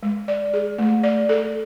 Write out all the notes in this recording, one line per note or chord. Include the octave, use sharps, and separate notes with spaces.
G#3
D5
G#4
A3
D5
A4